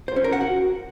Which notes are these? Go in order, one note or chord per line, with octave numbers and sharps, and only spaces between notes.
C5
C#4
A#4
F#5
F#4